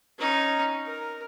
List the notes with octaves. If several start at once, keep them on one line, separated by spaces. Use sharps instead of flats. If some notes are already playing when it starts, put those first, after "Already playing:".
C#4 D#4
A#4